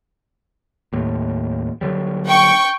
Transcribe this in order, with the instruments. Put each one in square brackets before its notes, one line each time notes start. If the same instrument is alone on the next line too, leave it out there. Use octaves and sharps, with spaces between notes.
[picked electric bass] D#2 A2
D3 F#3 G3
[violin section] G5 C#6